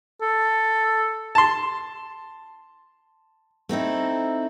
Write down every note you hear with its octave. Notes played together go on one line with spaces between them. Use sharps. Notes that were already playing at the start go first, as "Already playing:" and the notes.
A4
A5 C6
A3 C4 D#4 E4